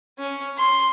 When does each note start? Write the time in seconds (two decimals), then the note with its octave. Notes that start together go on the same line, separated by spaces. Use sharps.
0.19 C#4
0.57 C6